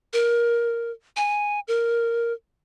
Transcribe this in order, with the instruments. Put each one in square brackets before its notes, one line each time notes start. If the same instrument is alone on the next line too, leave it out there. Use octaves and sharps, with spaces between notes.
[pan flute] A#4
G#5
A#4